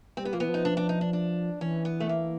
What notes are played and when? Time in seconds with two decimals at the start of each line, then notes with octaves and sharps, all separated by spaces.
0.17 G3 C4
0.25 B3
0.33 F3 A#3
0.40 E3 B3
0.49 F3
0.54 D#4
0.65 D4
0.77 D4
0.89 D#4
1.01 D4
1.13 D4
1.61 E3 C#4
1.85 B3
2.00 A3
2.09 A#3